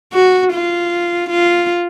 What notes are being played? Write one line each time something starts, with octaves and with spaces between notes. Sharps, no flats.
F#4
F4
F4